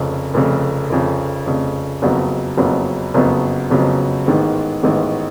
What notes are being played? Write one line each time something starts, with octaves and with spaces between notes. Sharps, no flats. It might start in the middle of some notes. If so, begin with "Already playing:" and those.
Already playing: F1 F2 C#3
F1 F2 C#3
F1 F2 C#3
F1 F2 C#3
F#1 F2 C#3 F#3 B3
F#1 F2 C#3 F#3 B3
F#1 F2 C#3 F#3 B3
F#1 F2 C#3 F#3 B3
A1 G#2 D#3 G#3 B3
A1 G#2 D#3 G#3 B3